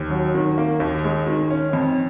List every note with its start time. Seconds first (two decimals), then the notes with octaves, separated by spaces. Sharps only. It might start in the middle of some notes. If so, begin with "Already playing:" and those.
Already playing: D#2
0.10 F#3
0.35 D#3
0.58 A#3
0.80 D#2
1.04 G#3
1.27 D#3
1.50 C#4
1.73 F2